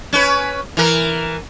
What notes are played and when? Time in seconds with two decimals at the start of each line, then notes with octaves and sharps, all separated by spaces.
0.13 C#4 B4
0.77 E3 A#4